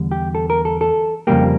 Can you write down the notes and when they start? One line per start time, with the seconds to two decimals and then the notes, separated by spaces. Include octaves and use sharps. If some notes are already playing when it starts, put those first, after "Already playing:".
Already playing: E2 D3 G3
0.11 G4
0.35 A4
0.50 A#4
0.65 A4
0.81 A4
1.27 F2 C#3 G3 A#3 G4